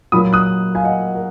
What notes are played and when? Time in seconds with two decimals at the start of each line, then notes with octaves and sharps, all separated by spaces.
0.12 A#2 F#3 A#3 B5 D#6
0.33 D#6 F#6
0.75 F5 G#5
0.84 D#5 F#5
1.15 A#4